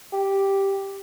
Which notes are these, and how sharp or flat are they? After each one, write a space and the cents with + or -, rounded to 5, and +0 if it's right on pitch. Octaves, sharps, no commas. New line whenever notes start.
G4 +0